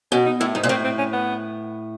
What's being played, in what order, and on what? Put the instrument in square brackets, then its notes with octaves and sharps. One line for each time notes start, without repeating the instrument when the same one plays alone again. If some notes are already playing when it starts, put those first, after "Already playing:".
[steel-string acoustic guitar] B2 [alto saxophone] C#4
[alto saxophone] D#4
[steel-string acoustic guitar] A2 [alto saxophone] E4
[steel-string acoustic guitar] G#2 [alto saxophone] D#4
[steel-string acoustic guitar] A#2
[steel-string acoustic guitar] A2 [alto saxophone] C4
[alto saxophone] C4
C#4
B3